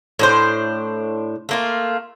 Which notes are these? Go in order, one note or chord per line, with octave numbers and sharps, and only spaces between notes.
A2 D4 C5
A3 A#3 F4